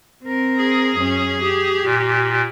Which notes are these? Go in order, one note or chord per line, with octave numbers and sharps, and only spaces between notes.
C4 A#4
G#4
F#2 C#4
G4
A#2